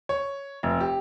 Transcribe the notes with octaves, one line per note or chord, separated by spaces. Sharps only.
C#5
F1
G4